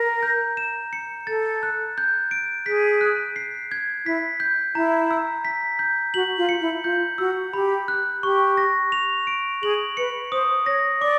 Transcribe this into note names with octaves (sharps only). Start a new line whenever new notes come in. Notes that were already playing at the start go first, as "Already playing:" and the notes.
Already playing: A#4 A#5
G6
E7
C#7
A4 A6
F#6
G6
D7
G#4 B6
F#6
C7
G#6
E4 B6
G6
E4 A#5
E6
B6
G6
F#4 F#7
F4
C#7
E4
F4 G6
F#4 E6
G4 B5
F#6
G4 C#6
A#6
F7
D7
G#4 F#7
B4 C#7
C5 D#6
C#5 A#6
D5 D6